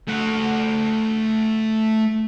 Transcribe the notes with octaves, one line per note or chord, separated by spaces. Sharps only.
A3 F#5